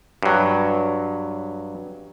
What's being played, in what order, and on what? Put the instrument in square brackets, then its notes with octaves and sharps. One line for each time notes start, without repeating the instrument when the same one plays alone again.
[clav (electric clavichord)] G2 F#3